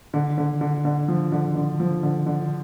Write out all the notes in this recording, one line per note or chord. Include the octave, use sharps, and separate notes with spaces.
D3
D3
D3
D3
F3
D3
D3
F3
D3
D3